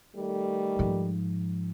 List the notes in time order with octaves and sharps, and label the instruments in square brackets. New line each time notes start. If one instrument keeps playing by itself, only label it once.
[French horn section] D#3 G3 A3
[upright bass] G#2 F3